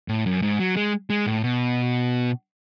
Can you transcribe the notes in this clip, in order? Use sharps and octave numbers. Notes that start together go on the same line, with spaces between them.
A2
F#2
G#2
F#3
G#3
G#3
A2
B2